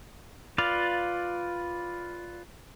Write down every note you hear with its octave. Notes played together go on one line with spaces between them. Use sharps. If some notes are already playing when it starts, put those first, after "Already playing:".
F4 B4 D5 F5